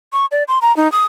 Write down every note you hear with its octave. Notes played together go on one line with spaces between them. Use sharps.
C#6
D5
C6
A#5
D#4
D#6